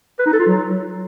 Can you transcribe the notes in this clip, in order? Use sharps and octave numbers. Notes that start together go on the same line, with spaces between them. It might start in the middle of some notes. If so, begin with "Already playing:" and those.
B4
D#4
A4
F4
F#3